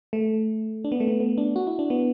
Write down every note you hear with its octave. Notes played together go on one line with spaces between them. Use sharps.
A3
D4
B3
A3
B3
B3
D4
F#4
E4
D4
B3